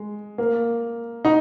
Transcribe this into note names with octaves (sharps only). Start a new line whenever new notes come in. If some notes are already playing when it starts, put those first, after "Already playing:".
Already playing: G#3
A#3
D#4